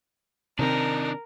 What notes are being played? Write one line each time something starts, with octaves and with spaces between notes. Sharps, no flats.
C3 D#3 C4 D4 D#4 A#4